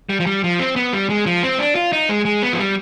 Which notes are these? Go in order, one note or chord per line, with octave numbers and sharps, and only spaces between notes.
G3
F3
G3
F3
C4
B3
G3
G#3
F3
C4
D4
F4
D#4
G#3
G#3
B3
F3
G3